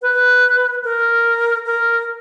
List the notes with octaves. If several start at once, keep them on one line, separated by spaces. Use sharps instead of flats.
B4
A#4
A#4